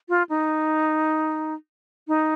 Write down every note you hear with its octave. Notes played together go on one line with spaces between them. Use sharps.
F4
D#4
D#4